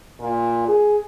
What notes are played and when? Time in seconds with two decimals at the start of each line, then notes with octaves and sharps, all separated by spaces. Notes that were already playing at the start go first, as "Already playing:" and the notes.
0.20 A#2
0.68 G#4